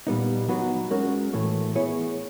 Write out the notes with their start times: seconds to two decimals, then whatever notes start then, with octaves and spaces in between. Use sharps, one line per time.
0.07 A#2 G3 B3 D#4
0.49 F#3 B3 D#4 F#4 B4
0.91 G#3 C#4 F#4 A#4 C#5
1.33 A2 E3 A3
1.75 B3 E4 G#4 C#5